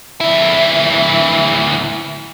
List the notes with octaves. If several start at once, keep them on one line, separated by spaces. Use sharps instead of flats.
D2 E4